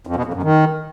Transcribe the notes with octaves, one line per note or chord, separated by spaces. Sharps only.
F2
B2
F2
F#2
D#3